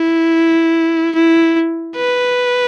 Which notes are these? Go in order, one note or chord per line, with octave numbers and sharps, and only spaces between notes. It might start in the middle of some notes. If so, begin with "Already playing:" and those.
Already playing: E4
E4
B4